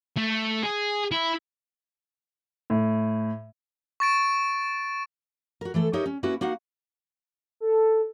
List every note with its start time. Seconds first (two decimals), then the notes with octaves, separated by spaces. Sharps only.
0.17 A3
0.63 G#4
1.11 E4
2.70 A2
4.00 C#6 A6 D7
5.61 F#4 A#4
5.74 E3 A3 A4
5.93 D#4 G4 A#4 C#5 D#5 E5
6.06 C#4
6.23 A#3 C#4 E4 F#4 B4
6.41 A#3 D#4 F#4 F5 F#5
7.60 A4